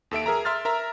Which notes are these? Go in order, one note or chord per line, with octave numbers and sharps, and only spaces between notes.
D#2 A4 E5 D7
G#4 A#4 E5 A#5
E5 C6 F6 A6
A#4 E5 A#5